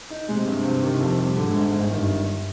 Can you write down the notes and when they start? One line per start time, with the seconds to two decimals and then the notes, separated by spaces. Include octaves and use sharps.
0.10 D#4
0.28 C3 G#3
0.47 G2
0.65 G2
0.83 D#3
1.01 F2
1.19 G3
1.37 G#2 D3
1.56 G1
1.74 G1
1.91 G2 D#3
2.10 G1